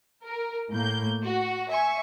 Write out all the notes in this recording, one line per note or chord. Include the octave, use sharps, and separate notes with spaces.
A#4
A2 A#3 G6
F#4
E5 G#5 C#6